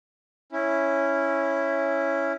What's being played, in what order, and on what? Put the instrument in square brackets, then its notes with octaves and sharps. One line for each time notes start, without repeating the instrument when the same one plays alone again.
[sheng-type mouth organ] C#4 E4